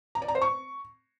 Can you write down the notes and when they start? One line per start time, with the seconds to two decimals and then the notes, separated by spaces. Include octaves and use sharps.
0.15 A#5
0.22 D5
0.28 A#5
0.35 C5
0.42 C#6